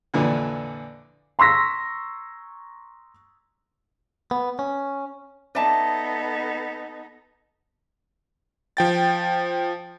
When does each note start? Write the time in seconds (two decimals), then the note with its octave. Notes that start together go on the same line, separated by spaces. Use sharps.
0.14 F2 A#2 D3 E3
1.39 A#5 C6 C#6 E6 A#6 B6
4.31 B3
4.59 C#4
5.55 B3 D#4 A4 D5 E5 A5
8.77 F3 G5 A6